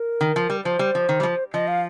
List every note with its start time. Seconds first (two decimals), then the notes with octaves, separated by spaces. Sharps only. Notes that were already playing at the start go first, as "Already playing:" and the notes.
Already playing: A#4
0.21 D#3
0.36 F3
0.50 G3
0.64 F3 C5
0.79 G3
0.95 F3
1.09 D#3
1.20 G3
1.23 F3
1.53 F3 D#5
1.68 F5